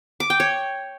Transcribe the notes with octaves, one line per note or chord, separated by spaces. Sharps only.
D6
G5
C#5